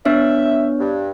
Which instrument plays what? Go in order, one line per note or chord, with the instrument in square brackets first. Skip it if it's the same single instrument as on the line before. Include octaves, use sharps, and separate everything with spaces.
[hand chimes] B3 D4 C#5 [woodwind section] E5
[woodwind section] G2